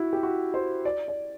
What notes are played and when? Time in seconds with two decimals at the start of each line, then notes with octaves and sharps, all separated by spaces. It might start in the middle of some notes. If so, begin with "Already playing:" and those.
Already playing: E4 F#4
0.13 G4
0.23 F#4
0.54 C5
0.85 D5
1.08 D5